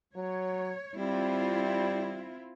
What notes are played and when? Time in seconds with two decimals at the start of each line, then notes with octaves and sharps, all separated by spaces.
0.16 F#3 C#5
0.98 G3 C4 E4 F4